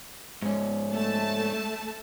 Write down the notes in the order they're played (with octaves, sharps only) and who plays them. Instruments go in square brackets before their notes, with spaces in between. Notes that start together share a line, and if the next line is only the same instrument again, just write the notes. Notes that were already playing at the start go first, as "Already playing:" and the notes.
[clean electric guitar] G#2 C#4
[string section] A3 A5